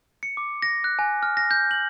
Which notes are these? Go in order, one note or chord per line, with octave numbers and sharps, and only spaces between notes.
C#7
D6
A#6
F#6
G#5
F6
A#6
G6
F#7